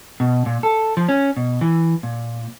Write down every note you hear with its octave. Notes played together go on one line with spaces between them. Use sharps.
B2
A#2
A4
F3
C#4
B2
E3
A#2